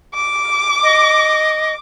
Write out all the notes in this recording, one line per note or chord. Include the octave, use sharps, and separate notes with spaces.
D6
D#5